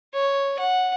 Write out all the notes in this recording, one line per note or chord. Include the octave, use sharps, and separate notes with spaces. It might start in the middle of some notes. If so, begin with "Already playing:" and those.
C#5
F#5